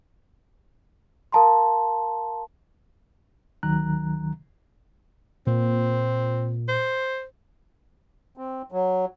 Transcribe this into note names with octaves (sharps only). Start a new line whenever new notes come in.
A#4 F5 A5 A#5 C6
D2 D#3 F#3 A#5 F#6
A#2 C4
C5
C4
F#3